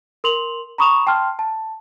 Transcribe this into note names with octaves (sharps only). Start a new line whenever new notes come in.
A#4 C6 F7 F#7
A#5 B5 C#6 D#6 E7 F7
G5 A5 C6 F6
A5